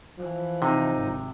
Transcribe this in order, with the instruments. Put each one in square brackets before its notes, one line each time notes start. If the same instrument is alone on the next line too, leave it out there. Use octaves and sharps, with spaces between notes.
[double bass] E3 [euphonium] F3
[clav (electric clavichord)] C3 [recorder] D#4
[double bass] G#1